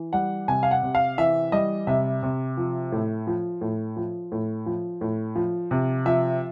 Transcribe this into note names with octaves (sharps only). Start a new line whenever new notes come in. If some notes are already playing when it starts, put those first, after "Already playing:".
Already playing: E3
G3 F#5
C3 G#5
F5
F#5
C3
F5
E3 E5
G3 D#5
C3 E5
C3
F3
A2
F3
A2
F3
A2
F3
A2
F3
C3
F3 E5